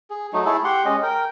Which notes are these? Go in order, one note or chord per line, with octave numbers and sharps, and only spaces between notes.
G#4
F#3 A3 D#4
A3 E4 G#4 A4
G4 F#5 C6
G#3 C#4 D#5
A#4 G5